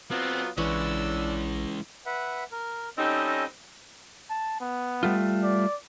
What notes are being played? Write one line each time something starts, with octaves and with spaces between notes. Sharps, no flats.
F#3 B3 C4 F4
A#1 E3 G#3 C#4 D4 E4 C#5 E6
B4 E5 F#5
A#4
G3 C4 C#4 D#4 A4 D#5
A5
B3
G3 A3 F4
D5